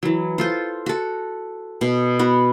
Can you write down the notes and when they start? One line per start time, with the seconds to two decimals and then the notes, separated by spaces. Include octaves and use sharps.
0.03 E3 F#3
0.38 F4 A4 C5
0.86 F#4 A4
1.81 B2
2.19 B3 F#4 B4